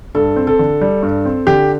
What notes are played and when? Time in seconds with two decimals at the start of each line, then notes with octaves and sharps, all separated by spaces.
0.15 G2 A4
0.36 C4
0.47 A4
0.59 D3
0.81 G3
1.03 G2
1.25 C4
1.47 D3 G4